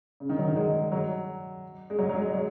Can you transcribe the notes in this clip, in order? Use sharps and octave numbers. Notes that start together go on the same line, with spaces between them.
C#3
D#3
F#3
D#3
G#3
F#3
G#3
F#3
F#3
G#3
F#3